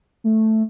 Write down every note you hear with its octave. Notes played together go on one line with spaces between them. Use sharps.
A3